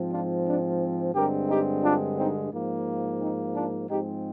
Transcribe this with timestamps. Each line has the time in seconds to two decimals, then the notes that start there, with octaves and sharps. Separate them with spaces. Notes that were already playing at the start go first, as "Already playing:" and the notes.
Already playing: G#2 F3 C4
0.12 D4 F4
0.47 D4
1.14 G2 D3 G#3 C4 G4 A#4
1.50 D#4 G4
1.83 D4 F4
2.18 C4 D#4
2.53 G#2 F3 A#3
3.21 C4 D#4
3.56 D4 F4
3.89 G#2 F3 G#3 C4 D#4 G4